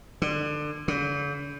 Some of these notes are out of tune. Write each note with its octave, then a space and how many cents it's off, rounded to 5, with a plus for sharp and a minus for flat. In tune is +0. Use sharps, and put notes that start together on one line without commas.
D3 +25
D3 -45